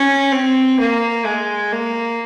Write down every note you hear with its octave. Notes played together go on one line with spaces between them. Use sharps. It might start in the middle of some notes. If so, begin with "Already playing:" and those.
Already playing: C#4
C4
A#3
G#3
A#3